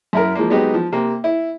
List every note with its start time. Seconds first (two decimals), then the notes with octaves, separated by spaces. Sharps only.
0.13 F#2 E4 A#4
0.35 F3 G#3 A#3
0.50 F#3 G#3 B3 D#4 G4
0.74 F3
0.92 C3 A#3
1.24 E4